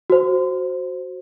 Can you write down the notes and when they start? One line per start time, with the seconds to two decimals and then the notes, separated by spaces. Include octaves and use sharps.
0.10 F#4 C5